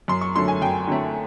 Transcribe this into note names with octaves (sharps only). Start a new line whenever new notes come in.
F#2 C6
C#6
D3 F#3 A3 C6
G#5
F#2 G5
D3 F#3 A3